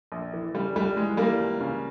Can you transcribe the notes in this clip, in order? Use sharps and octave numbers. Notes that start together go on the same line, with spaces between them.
A#1
E3
C#3 G3
C#2 G3
E3 G#3
E3 G3 A#3
C#2
C#3